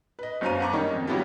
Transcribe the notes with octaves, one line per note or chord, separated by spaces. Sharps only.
B4 D#5
G1 F#2 C5 F5 A#5 D#7
F#5 A5 A#5 C#6 D6
D#3 G3 A#3 C#4 D#4
F2
F#3 G3 B3 E4 F4 G4